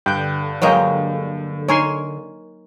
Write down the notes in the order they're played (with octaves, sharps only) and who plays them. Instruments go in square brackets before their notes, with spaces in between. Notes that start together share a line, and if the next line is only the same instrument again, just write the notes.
[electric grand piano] G2 F#6 [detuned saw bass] D3 [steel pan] G5
[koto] F#3 G#3 A#3 [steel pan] C#5 D#5 G5
[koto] D#4 A#4 [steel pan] C#5 G#5 C6